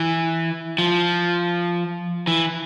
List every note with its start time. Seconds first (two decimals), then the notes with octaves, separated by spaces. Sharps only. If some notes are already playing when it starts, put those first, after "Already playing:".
Already playing: E3
0.78 F3
2.27 E3